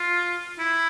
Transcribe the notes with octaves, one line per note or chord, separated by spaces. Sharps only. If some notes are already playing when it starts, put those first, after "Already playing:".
Already playing: F4
E4